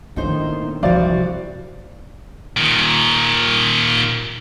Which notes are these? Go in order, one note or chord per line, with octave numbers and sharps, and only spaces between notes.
A2 D#3 A#3 B3 D4 D#4 C5
C2 E3 F3 F#4 C5 D5 F5
A#2 D#3